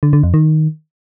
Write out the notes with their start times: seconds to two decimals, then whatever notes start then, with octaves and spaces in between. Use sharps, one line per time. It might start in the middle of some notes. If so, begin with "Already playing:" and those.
0.03 D3
0.13 D3
0.23 F2
0.34 D#3